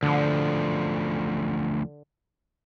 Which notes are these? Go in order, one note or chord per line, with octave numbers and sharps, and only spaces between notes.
D2 D3 F3